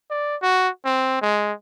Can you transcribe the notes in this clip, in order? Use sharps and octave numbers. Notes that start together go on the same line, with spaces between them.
D5
F#4
C4
G#3